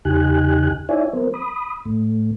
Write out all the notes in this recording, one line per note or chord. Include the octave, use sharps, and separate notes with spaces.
E2 C#3 D#4 G4 G#5 F#6
D#4 E4 C#5 D5 E5 G#5
F#3 B3 C4 A#4 C5
B5 D#6
A2 A3